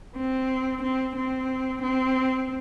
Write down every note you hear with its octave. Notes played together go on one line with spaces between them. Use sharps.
C4
C4
C4
C4